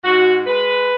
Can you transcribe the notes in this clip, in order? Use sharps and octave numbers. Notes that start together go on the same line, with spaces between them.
G#2 F#4
G#3 B4